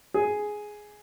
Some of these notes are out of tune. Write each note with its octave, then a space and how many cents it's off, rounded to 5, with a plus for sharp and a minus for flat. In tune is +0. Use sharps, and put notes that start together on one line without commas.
G#4 +5